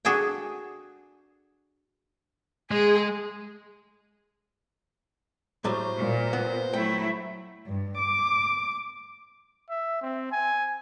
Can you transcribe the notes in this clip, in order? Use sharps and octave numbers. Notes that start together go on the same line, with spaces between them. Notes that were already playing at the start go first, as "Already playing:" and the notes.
D4 F#4 G#4 A4 G5
G#3 G#4
A2 F#3 G3 C5
A#2
B3
F#3 A3 E4 G5
G2
D6
E5
C4
G#5